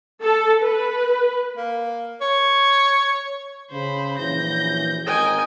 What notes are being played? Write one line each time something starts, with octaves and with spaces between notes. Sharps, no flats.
A4
B4
A#3
C#5
C#3 C5 B5
A#1 F#2 E3 G6 A#6
G#1 A#4 D#5 G5 G#5